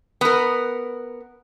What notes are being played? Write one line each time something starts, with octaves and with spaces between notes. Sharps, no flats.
B3 A#4